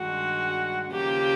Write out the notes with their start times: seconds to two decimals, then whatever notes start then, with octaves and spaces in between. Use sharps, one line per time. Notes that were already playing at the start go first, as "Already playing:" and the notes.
Already playing: G2 D#3 G#3 F#4
0.91 D#2 C#3 F3 A#3 G4